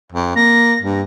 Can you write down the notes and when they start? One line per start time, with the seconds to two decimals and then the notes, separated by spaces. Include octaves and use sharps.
0.12 F2
0.35 A#3 A#6
0.82 G2